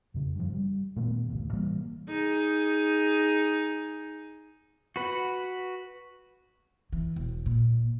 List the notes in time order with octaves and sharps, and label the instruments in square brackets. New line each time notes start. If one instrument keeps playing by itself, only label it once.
[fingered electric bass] F2 C#3
G2 F3
G3
A#2 D#3 A3 B3
E1 A1 D2 A2
C3 E3 G3 A#3
[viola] D#4 G#4
[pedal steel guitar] F#4 B4 F#5
[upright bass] E3
E1
A#2